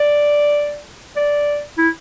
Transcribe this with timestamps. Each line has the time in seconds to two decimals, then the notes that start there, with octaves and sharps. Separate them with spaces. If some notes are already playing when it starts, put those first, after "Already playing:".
Already playing: D5
1.16 D5
1.78 E4